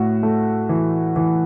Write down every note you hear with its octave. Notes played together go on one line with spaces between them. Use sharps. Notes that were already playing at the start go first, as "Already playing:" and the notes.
Already playing: A2 F#4
A3
E3
E3